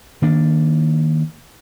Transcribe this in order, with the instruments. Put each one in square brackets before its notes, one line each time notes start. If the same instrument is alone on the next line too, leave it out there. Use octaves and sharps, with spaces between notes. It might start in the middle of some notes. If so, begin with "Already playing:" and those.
[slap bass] D#3 A#3 D4